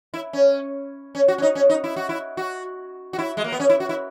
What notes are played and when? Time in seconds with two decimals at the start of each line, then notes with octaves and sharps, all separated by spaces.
0.14 E4
0.33 C#4
1.15 C#4
1.28 F#4
1.38 C#4
1.42 D#4
1.55 C#4
1.69 D#4
1.84 E4
1.96 F#4
2.09 E4
2.37 F#4
3.13 F#4
3.19 E4
3.37 G#3
3.44 A#3
3.52 B3
3.60 C#4
3.69 E4
3.80 F#4
3.89 E4